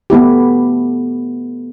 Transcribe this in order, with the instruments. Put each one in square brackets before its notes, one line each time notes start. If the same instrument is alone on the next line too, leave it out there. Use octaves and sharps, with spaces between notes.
[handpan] A3 B3 E4 G4